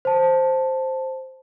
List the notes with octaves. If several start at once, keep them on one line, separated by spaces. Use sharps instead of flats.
C5 A5